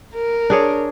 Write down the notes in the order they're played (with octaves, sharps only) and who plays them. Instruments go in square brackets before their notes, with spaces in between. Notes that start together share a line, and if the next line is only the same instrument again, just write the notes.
[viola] A#4
[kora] D4 G#4 C#5